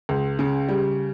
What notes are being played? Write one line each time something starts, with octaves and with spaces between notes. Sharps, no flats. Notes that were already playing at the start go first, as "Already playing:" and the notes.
C#2
C#3
G3